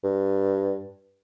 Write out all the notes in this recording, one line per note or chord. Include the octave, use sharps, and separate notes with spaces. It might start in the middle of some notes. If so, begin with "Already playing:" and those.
G2